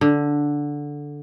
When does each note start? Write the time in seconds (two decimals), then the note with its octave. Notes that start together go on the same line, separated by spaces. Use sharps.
0.01 D3